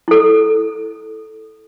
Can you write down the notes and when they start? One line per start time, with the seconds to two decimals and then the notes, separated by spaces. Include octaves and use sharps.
0.08 E4 A4